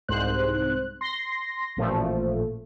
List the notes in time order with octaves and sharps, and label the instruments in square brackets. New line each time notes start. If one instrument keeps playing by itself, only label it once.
[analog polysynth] C2 G#2 C5 F#6
C6 A#6
A1 A#2 F3 A3